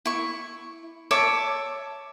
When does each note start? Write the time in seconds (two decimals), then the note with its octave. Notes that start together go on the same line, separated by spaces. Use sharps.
0.06 E4 C#6
1.11 C#5 E5 A5 D6